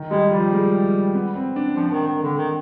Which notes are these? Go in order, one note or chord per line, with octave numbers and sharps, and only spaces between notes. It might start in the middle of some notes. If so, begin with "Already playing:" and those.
Already playing: D#3
G3 G#3
F3 G3
G#3
B3
C4
D4
F3 D4
D#3
D#3
D3
D#3